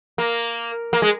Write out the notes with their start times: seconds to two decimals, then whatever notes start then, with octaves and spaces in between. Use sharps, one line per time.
0.18 A#3
0.93 A#3
1.02 G#3